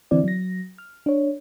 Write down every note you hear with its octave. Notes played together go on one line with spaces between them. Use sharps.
D3 E3 C4 E4 D5
F#3 A#6
F6
D4 C#5